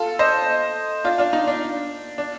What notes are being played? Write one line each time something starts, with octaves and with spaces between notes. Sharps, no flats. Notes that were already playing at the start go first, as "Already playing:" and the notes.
Already playing: F4 A4
C5 D#5
D4 F4
D4 F4
D#4
D4
D4